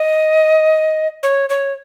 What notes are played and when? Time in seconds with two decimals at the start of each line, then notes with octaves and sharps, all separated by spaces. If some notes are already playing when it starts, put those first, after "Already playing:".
Already playing: D#5
1.23 C#5
1.50 C#5